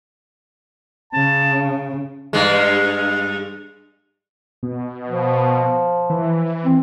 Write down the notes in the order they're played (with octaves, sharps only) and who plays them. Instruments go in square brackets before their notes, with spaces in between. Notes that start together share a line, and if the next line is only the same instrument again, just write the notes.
[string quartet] C#3 [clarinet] A5
[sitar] G2 G#3
[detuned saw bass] B2
[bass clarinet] F3
[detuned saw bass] E3
[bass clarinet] C4